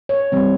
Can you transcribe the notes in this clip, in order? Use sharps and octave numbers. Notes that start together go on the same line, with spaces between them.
C#5
E3 G3 C4